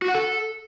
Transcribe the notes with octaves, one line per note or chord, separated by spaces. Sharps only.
F#4
F#5
A4